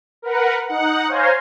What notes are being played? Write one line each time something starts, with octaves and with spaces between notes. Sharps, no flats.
A#4 B4 F#5
D#4 F#5
C5 C#5 F5 G#5 A#5 C6